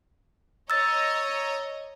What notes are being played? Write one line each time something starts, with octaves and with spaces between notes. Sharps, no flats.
C#5 D#5 A#5 E6 A6